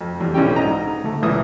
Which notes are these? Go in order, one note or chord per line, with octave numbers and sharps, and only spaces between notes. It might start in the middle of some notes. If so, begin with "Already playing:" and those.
F2
E2 G3
B1 E3 C#4 D4 G4 G5
G#2 D#5 A#5
D2 A3
C#2 A#2 E3 E5 D#6